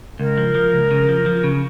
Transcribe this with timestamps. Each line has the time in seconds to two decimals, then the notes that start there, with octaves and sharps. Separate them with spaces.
0.20 C#2 A#4
0.38 F3
0.55 F3
0.73 C#2
0.91 C#3
1.09 F3
1.26 F3
1.44 C#3